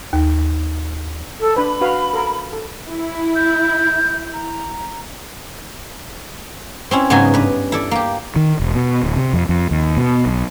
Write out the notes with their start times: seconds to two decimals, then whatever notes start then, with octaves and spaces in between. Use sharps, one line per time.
0.13 D#2
1.40 A4
1.57 D4 B4 B5
1.81 F#4 B4 F5
2.14 A4 A#4
2.53 A4
2.87 E4
3.36 G6
4.34 A#5
6.91 C4 C#4 E4
7.10 G#2 C#3 F#3 B3 D#5 G#5
7.34 G2 B4
7.72 E4 A4 D5
7.91 A#3 G4
8.36 D#3
8.60 E1
8.75 B2
9.04 D1
9.16 C3
9.33 F2
9.49 F2
9.71 D#2
9.97 B2
10.26 B1